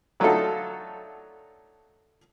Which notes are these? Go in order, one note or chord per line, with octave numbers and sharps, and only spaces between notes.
D3 F#3 A3 D#4 F4 A4